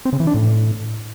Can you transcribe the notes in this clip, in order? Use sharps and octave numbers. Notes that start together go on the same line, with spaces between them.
C4
C#3
E3
D4
A2